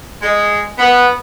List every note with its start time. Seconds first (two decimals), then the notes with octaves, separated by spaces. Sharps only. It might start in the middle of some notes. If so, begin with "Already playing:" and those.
0.22 G#3
0.78 B3